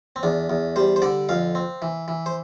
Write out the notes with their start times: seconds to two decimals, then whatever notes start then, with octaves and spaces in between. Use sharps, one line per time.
0.16 C4
0.23 E2 D4
0.50 E2
0.76 G3 C5
0.96 C5
1.02 D3 D5
1.29 F2 F5
1.55 C4
1.82 E3
2.08 E3
2.26 C5